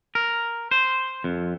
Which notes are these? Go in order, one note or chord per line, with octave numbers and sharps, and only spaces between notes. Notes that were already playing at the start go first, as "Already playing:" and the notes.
A#4
C5
F2